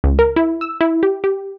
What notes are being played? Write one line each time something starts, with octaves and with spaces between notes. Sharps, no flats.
C#2
A#4
E4
E6
E4
G4
G4